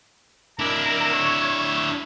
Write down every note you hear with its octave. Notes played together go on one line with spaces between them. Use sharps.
D4 E4 A#4
C#5